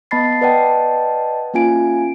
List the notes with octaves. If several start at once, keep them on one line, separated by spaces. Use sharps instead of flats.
B3 D#5 A5 B5 A6 C7
B4 D5 D#5 F#5 G5 A5
A#3 C#4 F4 G#5 D7